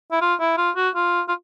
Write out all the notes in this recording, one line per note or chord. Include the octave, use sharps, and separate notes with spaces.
E4
F4
E4
F4
F#4
F4
F4